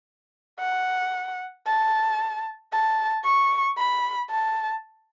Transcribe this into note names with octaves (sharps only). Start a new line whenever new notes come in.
F#5
A5
A5
C#6
B5
A5